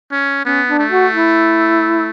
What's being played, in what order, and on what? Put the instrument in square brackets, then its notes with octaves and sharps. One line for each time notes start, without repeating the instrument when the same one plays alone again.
[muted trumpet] C#4
[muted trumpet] B3 [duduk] C#4
[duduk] D4
[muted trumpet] A3
[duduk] F#4
E4